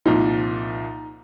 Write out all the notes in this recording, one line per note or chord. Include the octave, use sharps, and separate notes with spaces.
C2 A#2 F3 D#4